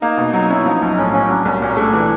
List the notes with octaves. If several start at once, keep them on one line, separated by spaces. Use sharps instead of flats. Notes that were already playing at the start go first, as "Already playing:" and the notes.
A#3 D#4
B2
F#3 D#4
C#4 E4
F3 D#4
B1
A2 C#4
A#3 C#4
F#3 D4
C2 C#4
A#2 C#4
A3 D4
E3